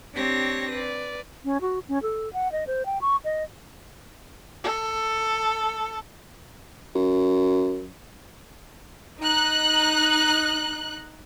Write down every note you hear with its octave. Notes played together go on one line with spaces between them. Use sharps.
C4 D4 G4 C#5 A#6
B4 D5
C#4
F#4
C#4
A4
F#5
D#5
C5
G5
C#6
D#5
A4
F#2
D#4 F#6